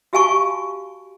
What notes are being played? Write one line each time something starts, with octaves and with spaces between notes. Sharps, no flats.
F#4 G4 F5 G#5 A5 C#6